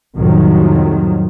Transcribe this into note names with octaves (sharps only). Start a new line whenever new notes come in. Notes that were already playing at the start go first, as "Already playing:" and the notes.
C2 F2 A2 C3 D#3 F#3